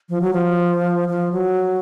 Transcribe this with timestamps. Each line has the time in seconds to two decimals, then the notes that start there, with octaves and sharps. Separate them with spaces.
0.09 F3
0.21 F#3
0.33 F3
1.08 F3
1.32 F#3